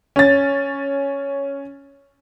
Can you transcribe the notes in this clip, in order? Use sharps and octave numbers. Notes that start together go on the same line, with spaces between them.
C#4 A6